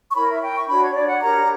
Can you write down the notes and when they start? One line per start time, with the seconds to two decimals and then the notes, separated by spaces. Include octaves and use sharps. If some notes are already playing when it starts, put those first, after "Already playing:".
0.09 C#6
0.15 E4 A#4 C#5 B5
0.28 E5
0.42 G5
0.55 C#6
0.68 D4 F#4 C#5 B5
0.81 C#5
0.94 D5
1.08 F#5
1.21 D4 G4 A#4 C#5 A#5